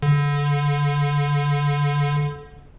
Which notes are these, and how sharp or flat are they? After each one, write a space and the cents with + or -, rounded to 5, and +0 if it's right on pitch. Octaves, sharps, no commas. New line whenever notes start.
D3 -25